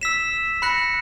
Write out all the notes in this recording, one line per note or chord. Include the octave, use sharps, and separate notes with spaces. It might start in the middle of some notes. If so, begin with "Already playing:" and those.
E6 B6 E7
B5 F#6 A#6 C#7